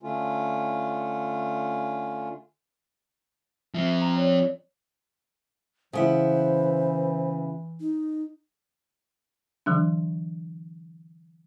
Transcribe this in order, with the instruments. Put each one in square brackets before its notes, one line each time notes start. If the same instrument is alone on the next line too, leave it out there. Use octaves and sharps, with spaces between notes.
[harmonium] D3 A3 C#4 F4
[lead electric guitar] F3 C4 [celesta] E5 C7 G7
[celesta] A#5
C#5 D5
[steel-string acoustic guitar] C#3 B3 E4 [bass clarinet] E3 [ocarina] C5
[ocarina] D#4
[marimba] D3 E3 F#3 D4